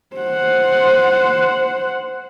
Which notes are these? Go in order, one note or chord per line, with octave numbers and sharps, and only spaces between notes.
C5 F#5